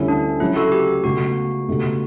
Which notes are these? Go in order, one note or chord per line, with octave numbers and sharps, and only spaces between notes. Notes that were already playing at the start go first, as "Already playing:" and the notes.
Already playing: D2 D3 G3 C#4 E4
D4
C#2 C#3 F#3 E4
F#4 A4
G4
C#2 B2 A3 F#4
C#2 B2 A3 D4 G4